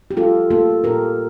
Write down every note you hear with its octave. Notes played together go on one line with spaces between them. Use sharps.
G4
G3 F4 A4
A#3 F4 A4
A#2 G4 A#4